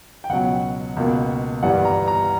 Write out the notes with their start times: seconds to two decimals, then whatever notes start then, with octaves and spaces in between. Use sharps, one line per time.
0.24 G5
0.29 C#2 B2 F#3 F#5
0.96 C#2 B2 A#3
1.63 G1 G2 E3 G3 F#5
1.85 A#5
2.08 A#5